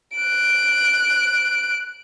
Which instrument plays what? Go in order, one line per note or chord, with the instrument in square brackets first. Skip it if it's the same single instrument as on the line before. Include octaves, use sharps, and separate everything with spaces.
[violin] F#6 D7